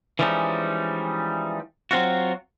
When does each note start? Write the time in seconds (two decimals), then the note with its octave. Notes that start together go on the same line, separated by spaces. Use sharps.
0.19 E3 F3 G3 G#3 C#4 D#4
1.91 F#3 C4 F4 F#4